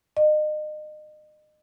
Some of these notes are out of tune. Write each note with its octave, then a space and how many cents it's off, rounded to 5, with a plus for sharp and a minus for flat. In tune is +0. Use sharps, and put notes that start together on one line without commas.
D#5 -35